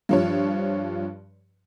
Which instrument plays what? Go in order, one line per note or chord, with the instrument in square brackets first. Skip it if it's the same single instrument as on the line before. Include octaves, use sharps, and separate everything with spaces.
[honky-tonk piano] G2 F3 C#5